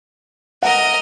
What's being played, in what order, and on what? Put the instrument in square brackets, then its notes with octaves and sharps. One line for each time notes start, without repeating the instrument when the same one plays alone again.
[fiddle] A#4 D#5 [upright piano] F#5